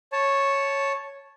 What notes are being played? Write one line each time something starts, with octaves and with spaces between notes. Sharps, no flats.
C#5 A5